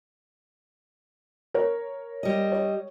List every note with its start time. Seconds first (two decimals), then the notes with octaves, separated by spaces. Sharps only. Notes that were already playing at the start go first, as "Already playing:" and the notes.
1.54 A#4 C#5
2.23 G3 D#5
2.52 C#5